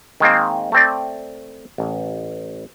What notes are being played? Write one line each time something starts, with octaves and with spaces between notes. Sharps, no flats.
D#3 G#3 A#3 C4
A3 C4 D5
A1